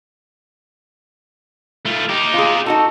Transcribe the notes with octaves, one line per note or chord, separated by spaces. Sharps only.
A3 F4
D#4 G4
F4 G#4
D#4 F#4 A4